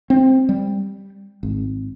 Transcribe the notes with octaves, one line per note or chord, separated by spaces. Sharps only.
C4
G3
G#1